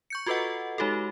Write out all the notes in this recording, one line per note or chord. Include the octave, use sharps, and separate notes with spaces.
C#6 G6 C#7
F4 F#4 A4 B4 D#5 F#5
G#3 D#4 F#4 G4 A4